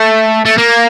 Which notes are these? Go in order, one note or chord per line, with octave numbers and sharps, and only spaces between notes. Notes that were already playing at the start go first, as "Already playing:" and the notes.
Already playing: A3
A3
A#3